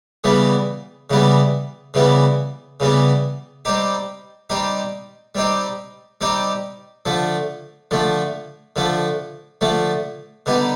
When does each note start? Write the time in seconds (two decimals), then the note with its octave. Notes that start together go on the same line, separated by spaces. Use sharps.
0.24 C#3 E3 G3 B3
1.10 C#3 E3 G3 B3
1.94 C#3 E3 G3 B3
2.80 C#3 E3 G3 B3
3.65 G3 C4 D#4 G4
4.50 G3 C4 D#4 G4
5.35 G3 C4 D#4 G4
6.21 G3 C4 D#4 G4
7.06 D3 F3 A3
7.91 D3 F3 A3
8.76 D3 F3 A3
9.61 D3 F3 A3
10.46 D3 G3 B3 D#4